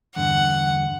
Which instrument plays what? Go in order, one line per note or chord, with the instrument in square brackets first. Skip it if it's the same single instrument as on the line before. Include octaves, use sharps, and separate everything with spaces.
[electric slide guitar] E2 G2 D3 [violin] F#5